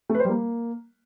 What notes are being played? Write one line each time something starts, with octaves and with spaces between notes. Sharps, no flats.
A3
B4
C5
G3
A#3